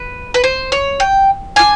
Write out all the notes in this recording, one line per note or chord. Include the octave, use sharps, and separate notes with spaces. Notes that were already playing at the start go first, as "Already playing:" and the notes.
Already playing: B4
B4
C5
C#5
G5
D4 F4 G#5